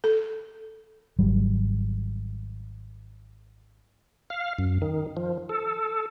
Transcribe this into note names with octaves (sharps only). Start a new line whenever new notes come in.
A4
G#1 F#3 G3
F5
F#2
D#3
F3
A4